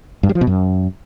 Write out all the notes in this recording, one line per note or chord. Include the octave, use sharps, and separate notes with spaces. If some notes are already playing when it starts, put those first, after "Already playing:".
G2
G3
F3
B2
F#2